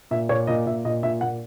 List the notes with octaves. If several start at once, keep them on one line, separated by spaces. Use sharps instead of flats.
A#2 E5
A#2 C#5
A#2 D#5
A#2 E5
A#2 D#5
A#2 E5
A#2 F#5